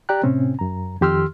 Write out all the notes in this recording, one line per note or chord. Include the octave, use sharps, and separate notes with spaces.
G4 D5 G5 A#5 F#6
A2 C3 C4 C#4
F#2 A#5
F2 D#3 G4 C6 E6 F6